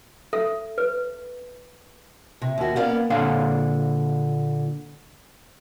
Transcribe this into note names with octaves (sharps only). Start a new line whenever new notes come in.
A4 E5
B4
C3
D#2 F#4
A#3 B3 C#4 A#4 D5 F5
A#2 D3 F5